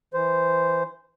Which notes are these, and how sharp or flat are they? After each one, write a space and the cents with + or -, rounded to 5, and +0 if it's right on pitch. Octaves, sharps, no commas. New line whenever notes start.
E3 +0 C5 -10